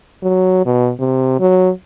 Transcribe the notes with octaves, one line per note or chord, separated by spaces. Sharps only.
F#3
B2
C3
F#3